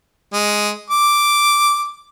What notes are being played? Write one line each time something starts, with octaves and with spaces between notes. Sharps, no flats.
G#3
D6